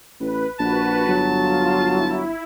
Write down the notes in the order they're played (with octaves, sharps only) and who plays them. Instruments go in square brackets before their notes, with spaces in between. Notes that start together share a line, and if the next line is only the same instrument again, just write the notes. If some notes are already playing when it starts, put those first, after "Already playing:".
[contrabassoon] A1 [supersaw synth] B4
[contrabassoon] A#1 [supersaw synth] F#4 B4 [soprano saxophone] A5
[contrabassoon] G1 [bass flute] F#3
[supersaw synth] F4
E4